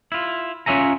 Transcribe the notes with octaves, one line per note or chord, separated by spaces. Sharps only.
E4 F4
C#4 F4 C#5 E5 G#5 A#5